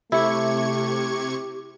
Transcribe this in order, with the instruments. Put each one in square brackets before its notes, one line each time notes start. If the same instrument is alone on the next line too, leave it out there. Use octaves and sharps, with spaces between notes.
[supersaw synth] C3 C#6 G#6 [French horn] A3 [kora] E4 [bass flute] G4